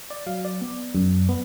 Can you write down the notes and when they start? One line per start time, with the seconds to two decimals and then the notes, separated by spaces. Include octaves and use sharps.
0.10 D5
0.27 F#3 F5
0.45 D5
0.61 B3
0.95 F#2
1.29 B3